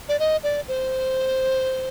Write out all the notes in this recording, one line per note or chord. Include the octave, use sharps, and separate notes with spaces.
D5
D#5
D5
C5